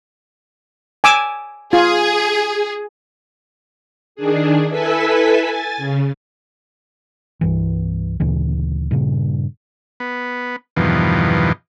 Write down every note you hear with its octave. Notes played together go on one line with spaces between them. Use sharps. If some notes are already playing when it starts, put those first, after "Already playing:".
G#5 D6 E6
F4 G#4
D#3 D4 G#4
E4 A4 B4 G#5 E6 B6
G#5 A6
C#3
C2 G2 E3
D2 A#2 C#3 E3
G2 A#2 C#3
B3
E2 G2 B2 D#3 F3